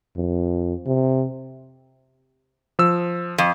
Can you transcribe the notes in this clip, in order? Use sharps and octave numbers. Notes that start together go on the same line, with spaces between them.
F2
C3
F3 E6
F2